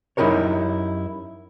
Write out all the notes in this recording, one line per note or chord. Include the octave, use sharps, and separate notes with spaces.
F#2 D#4 E4 G4 A#4 C#5